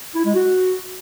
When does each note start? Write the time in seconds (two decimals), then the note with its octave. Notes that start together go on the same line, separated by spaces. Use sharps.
0.15 E4
0.25 G#3
0.35 F#4